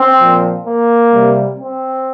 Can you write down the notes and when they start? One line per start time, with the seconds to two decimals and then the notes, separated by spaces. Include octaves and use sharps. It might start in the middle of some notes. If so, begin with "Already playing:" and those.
Already playing: C4
0.20 A#2 F3
0.66 A#3
1.13 C3 G3
1.59 C4